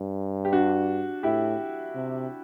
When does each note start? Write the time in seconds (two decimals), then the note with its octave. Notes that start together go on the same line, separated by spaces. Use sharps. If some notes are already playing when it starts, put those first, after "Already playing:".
Already playing: G2
0.45 G4
0.53 D4 F#4
1.23 A2 E4 G4
1.95 C3